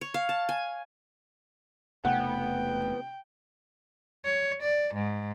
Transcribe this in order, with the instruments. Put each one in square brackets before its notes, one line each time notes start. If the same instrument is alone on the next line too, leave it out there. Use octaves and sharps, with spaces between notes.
[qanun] C#5
F5
A5
G#5
[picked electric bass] E1 C3 A3 [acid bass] B3 [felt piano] F#5 [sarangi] G5
[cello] C#5
D5
G#2